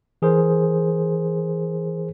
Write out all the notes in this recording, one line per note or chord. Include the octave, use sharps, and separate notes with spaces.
E3 G#4 A#4 C5